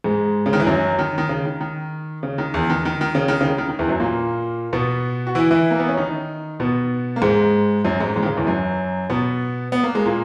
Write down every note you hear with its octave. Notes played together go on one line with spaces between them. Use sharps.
G#2 G#3
C#3
D#3
E3
F#2 F#3
D#3
D#3
C#3
D#3
D#3
C#3
D#3
E2 E3
D#3
D#3
D#3
C#3
D#3
C#3
D#3
D#3
D#3
E2 E3
F#2 F#3
A#2 A#3
B2 B3
F#4
E3 E4
E3 E4
A#3
B3
C#4
D#3 D#4
B2 B3
A#3
G#2 G#3
F#2 F#3
G#2 G#3
G#2 G#3
D#3
C#3
E2 E3
F#2 F#3
B2 B3
B3
A#3
G#3
A#2 A#3